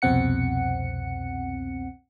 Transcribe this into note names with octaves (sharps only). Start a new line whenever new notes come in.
C2 F2 B2 C4 F#5 C#7